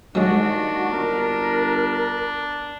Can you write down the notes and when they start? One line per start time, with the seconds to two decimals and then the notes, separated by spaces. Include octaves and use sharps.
0.15 D#2 F#3 G#3 D4 F#4
0.90 G1 A#4